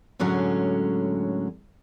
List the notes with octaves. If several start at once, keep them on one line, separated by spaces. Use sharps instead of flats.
A2 D3 F#3 G#3 C#4